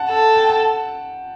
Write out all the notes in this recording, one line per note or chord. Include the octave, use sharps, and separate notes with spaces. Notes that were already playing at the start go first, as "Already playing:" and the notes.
Already playing: F#5 A5
A4
G5
A5